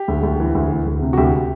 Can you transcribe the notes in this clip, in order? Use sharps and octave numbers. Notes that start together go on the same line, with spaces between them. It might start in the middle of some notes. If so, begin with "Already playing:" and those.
Already playing: G4
D2
D2
E3
D2
E3
D2
C3
F#4
D2 G4